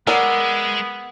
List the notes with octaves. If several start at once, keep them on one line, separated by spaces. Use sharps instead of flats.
G#3 B3 A#4 D5 F#5 E6